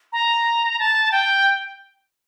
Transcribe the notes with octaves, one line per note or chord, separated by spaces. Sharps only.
A#5
A5
G5